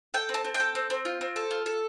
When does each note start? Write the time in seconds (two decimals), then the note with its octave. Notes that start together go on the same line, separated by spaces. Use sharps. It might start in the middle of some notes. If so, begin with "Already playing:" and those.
0.14 A4 G5
0.29 C4
0.34 A5
0.44 C4
0.54 G5
0.60 A4
0.75 C4
0.90 C4
1.05 F4
1.21 C4
1.36 A4
1.51 F4
1.66 A4